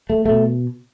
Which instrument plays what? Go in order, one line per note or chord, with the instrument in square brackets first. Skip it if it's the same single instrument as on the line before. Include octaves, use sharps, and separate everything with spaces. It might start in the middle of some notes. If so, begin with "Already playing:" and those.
[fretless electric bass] A3
B2 A3